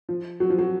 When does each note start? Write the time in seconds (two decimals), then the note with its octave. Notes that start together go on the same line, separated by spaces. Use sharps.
0.09 F3
0.40 F#3
0.50 F3
0.59 F#3